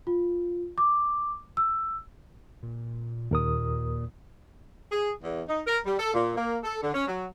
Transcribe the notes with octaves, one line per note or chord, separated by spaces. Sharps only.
F4
D6
E6
A#2
D#2 A#2 A#4 D#6
G#4
E2
D#4
A#4
G3
A4
A#2
A#3
A4
D3
C#4
F#3